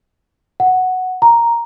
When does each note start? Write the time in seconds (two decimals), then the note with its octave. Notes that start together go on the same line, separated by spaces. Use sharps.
0.60 F#5
1.22 A#5